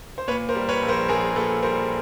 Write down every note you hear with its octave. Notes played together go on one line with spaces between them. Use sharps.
C5
A#2 B4 C#5
A#4 C5
G3
B4 C#5
A#1
A#4 C5
A#1 G#4 A#4
A#2 A4 B4
G3 A#4 C5